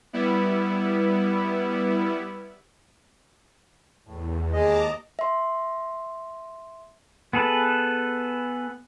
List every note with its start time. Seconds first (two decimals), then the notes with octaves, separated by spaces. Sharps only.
0.13 G3 B3 E4
4.07 E2 A2
4.53 D#2 G#3 D#5 A5 A#5 D6
5.19 E5 C6
7.33 B3 G#4 A4 B4